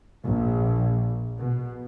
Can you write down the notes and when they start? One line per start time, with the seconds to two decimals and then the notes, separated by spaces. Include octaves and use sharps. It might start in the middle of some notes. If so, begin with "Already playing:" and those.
0.24 A#1
1.37 B2